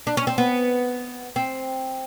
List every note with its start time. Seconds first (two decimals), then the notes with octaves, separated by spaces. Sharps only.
0.07 D4
0.17 C#4
0.27 C4
0.38 B3
1.36 C4